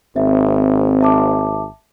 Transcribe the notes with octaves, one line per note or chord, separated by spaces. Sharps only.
G#1 C4 E5
E5 A5 D6